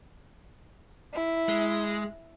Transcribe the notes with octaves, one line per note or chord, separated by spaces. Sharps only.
E4
G#3